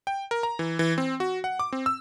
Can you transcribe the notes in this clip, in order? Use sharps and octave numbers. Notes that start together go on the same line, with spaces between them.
G5
A#4
A#5
E3
E3
C4
F#4
F#5
D6
C4
E6